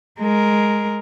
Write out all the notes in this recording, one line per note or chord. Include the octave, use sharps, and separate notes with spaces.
G#3 A#4